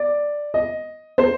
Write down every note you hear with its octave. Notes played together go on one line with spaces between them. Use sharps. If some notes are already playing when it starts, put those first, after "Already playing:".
Already playing: D5
D#5
C5